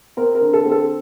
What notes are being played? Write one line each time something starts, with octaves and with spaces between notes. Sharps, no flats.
C4 A#4
A#4
D3
A4
C4
A4